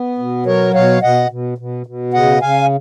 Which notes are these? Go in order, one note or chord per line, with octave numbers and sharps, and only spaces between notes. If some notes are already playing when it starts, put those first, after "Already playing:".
Already playing: B3
B2
F#3 A#4 C#5
B2 C#5 F5
B2 D#5 F#5
B2
B2
B2
C#3 D#5 F#5
C#3 F5 G#5